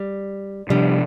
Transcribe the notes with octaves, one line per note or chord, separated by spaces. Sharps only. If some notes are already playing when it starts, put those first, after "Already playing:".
Already playing: G3
C3 F3 G3 D4